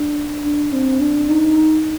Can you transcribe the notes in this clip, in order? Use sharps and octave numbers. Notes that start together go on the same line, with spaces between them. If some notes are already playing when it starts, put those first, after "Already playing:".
Already playing: D4
D4
C4
D4
D#4